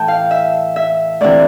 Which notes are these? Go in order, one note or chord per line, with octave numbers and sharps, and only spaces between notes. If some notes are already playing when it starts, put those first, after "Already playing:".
Already playing: A2 E3 G5 A5
F5
E5
E5
D2 C3 E3 D5